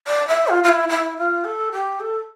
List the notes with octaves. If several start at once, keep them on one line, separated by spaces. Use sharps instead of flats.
D5
E5
F4
F4
E4
E4
F4
A4
G4
A4